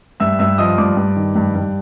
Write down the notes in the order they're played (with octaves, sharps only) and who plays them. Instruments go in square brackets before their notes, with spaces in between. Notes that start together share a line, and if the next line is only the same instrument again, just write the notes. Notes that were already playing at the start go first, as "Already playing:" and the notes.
[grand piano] G2 E5 E6
G2 E5 E6
F3 D#5 D#6
G2 D5 D6
G2
D#3
G2
G2